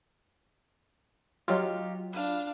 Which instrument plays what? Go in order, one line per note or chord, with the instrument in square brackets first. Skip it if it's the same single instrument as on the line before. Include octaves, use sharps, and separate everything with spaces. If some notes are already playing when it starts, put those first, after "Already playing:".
[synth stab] F#3 F4 [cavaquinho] D#4 G4 F5
[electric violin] D4 F5 [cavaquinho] B4